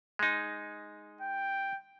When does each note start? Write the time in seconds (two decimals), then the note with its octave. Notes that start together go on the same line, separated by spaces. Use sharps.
0.19 G#3 D#4
1.21 G5